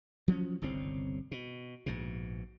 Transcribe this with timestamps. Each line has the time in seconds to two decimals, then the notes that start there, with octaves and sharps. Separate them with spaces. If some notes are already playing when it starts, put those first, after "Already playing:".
0.28 F3 F#3 A3 C#4
0.62 G1 C2 C#3 C4
1.31 B2
1.86 A#1 G#2 B2